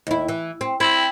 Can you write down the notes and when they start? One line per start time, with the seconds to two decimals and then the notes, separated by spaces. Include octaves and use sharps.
0.07 D#2 E4
0.28 E3
0.61 C4
0.80 C4 E4